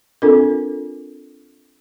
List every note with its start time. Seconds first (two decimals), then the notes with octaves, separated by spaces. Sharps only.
0.22 C4 D4 F4 A4 A#4